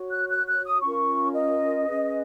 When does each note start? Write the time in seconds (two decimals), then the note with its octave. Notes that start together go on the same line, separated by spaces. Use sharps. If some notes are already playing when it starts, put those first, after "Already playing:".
Already playing: F#4 C#5
0.12 F#6
0.29 F#6
0.46 F#6
0.64 D#6
0.81 C#4 F4 A#4 C#6
1.35 D#5
1.87 C#4 G#4 B4